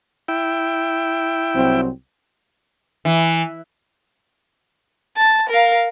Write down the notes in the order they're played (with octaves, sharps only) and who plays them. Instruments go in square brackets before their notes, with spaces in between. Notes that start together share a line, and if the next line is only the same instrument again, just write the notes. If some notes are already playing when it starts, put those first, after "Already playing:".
[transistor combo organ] E4 G5
[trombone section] C2 F#3 C4
[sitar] E3
[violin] A5
A#4 F5